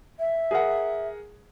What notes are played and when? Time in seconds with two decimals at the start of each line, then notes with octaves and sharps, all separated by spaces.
0.19 E5
0.51 G#4 A#4 F#5